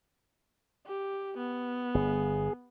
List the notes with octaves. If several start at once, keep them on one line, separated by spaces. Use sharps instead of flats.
G4
B3
G1 G#4